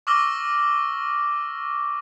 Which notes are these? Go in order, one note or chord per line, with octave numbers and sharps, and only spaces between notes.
C#6 D6 E6 F6 A#6 G7